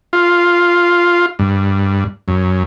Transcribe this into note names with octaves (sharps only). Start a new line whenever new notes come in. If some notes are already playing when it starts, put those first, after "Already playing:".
F4
G2
F#2